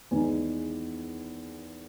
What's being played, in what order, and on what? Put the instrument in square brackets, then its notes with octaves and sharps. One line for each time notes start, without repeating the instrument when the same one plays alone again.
[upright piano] E2 D#3 G#3 D#4 G#5